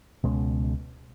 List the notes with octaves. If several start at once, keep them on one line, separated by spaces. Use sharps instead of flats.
C#2 B2 G#3 C#4